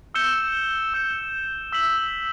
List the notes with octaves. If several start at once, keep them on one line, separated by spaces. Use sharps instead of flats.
E6 G6 C#7 E7 G7
E6 G6 C#7 E7 G7
E6 B6 F#7